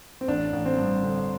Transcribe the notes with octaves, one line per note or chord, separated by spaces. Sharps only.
C4
A1 D4
A1
C4
G2
D3